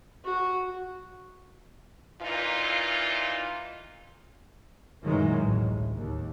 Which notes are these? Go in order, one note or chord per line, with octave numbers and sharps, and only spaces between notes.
F#4
A#2 E3 D#4 F4
F#2 A#2 D#3 E3 F#3 G#3
A1 D2
D#2